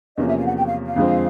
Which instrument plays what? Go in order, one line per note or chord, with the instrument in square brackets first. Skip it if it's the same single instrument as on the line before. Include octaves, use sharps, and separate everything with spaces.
[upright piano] E2 C3 F3 A#3 C#4 [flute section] D#5
[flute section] E5
F5
F#5
G5
F5
F5
[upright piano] F2 D3 F3 G#3 C4